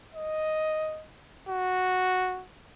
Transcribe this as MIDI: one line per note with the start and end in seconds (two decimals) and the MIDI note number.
0.14 1.05 75
1.49 2.43 66